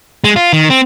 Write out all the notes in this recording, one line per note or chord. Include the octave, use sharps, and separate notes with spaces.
G#3
F4
D#3
C4